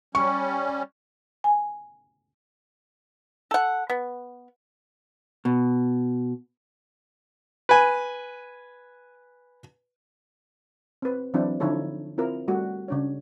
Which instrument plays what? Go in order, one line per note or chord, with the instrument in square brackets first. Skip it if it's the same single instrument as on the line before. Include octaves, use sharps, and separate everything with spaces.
[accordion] G3 C#4 [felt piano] C#6
[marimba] G#5
[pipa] A4 F#5
B3
[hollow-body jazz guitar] B2
[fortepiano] B4 G#5
[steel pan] C4 B4
E3 F#3 C4 D4 E4
D3 F3 D#4 E4 A4 C#5
C4 E4 F4 A#4
G3 A3 F#4
C#3 D4 C#5